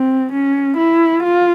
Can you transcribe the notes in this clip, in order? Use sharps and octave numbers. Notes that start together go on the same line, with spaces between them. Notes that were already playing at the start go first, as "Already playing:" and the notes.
Already playing: C4
C#4
E4
F4